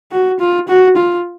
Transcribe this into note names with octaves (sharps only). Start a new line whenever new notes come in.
F#4
F4
F#4
F4